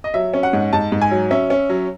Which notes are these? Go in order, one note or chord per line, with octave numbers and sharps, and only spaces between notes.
D#5
F#3 E5
C#4
F#5
G#2
G#2 A5
G#2
G#5
F#3
C#4 E5
C#4
F#3